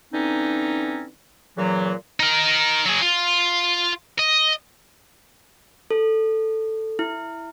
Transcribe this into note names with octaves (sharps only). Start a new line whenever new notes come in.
D3 E3 C4 C#4 D#4
A#2 C#3 E3 F#3
D#4 A#4
F#3 G#4
F4
D#5
A4
E4